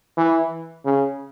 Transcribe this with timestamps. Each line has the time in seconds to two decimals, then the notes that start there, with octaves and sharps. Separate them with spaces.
0.17 E3
0.85 C#3